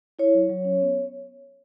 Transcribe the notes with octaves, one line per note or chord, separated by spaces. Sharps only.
E4 C#5
F#3
F#3
C#4
B3